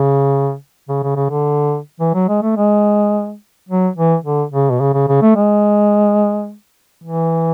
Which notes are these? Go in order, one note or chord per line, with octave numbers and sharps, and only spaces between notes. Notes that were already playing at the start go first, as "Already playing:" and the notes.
Already playing: C#3
C#3
C#3
C#3
D3
E3
F#3
G#3
A3
G#3
F#3
E3
D3
C#3
B2
C#3
C#3
C#3
A3
G#3
E3